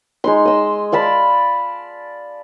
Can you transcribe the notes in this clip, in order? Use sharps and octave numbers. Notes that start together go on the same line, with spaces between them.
G#3 D#4 C6
D#5 E6
D5 F5 A5 B5